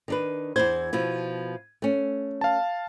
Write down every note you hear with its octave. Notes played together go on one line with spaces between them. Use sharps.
D#3 D4 B4
E2 E4 C5 G#6
B2 F3 E4
A3 C#4
F5 A5